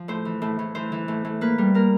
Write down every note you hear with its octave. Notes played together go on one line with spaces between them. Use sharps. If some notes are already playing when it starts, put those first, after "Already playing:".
Already playing: F3
A2 C5
E3
A2
A2
E3 C5
E3
A2
A2
A#3 B4
G3
A#3 A#4